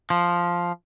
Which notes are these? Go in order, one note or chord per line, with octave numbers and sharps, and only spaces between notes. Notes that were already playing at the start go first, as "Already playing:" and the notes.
F3